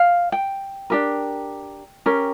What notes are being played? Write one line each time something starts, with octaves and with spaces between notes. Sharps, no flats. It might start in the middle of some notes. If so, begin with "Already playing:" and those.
Already playing: F5
G5
D4 G4 A#4
C#4 G4 A#4